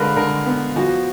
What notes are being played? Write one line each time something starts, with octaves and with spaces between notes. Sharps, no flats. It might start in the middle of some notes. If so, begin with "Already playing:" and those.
Already playing: D3 G#3 A#4 B4 F5
D3 A#4
B3
F3 F#4